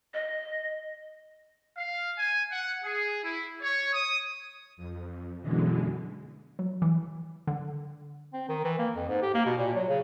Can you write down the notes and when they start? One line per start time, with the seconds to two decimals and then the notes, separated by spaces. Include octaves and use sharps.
0.14 D#5
1.77 F5
2.17 G#5
2.51 F#5
2.83 G#4
3.23 E4
3.62 C#5
3.93 D#6
4.77 F2
5.41 F#2 B2 D3 E3 G#3
6.59 F#3
6.82 E3
7.47 D3
8.33 C4
8.49 D#3
8.64 E3
8.79 A#3
8.95 F2
9.08 G#2
9.22 G4
9.34 A#3
9.46 B2
9.58 A#2
9.75 F#3
9.88 C#3